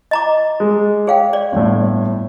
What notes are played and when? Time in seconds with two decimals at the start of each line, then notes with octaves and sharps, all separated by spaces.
0.11 D#5 A#5 D6
0.60 G#3
1.07 G#4 C#5 F5 G5
1.33 D5
1.52 G1 A2